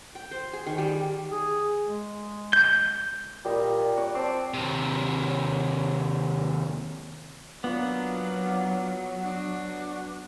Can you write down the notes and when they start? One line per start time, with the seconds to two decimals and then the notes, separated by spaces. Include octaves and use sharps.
0.15 G5
0.31 C5
0.53 G#4
0.67 D#3
0.78 G3
1.32 G#4
1.86 G#3
2.53 G6
3.45 A#2 G3 D#5
3.97 D5 F#5 C#6
4.15 C4 D5 A5
4.54 D#2 C3
7.64 F#3 A#3 B3 D4 F4
9.24 D4 F#4